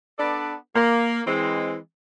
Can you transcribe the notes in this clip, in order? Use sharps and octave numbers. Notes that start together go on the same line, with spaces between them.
B3 D4 A4 B4 D5
A#3
E3 G#3 C4